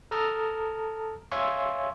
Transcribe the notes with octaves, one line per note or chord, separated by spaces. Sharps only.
A4 A5 A#5 D#6 F6
C#5 E5 F5 G#5 C6 C#6